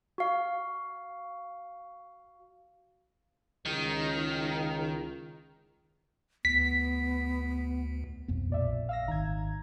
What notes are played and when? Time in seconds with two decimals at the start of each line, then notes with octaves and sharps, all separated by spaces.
0.18 F#4 F5
3.66 C#2 D#3
6.45 D2 B3 B6
8.28 B1 F2 B3
8.50 A#2 D5 E5
8.65 A#1
8.89 F5 E6 A#6
9.08 G#1 D#3 A#5 G#6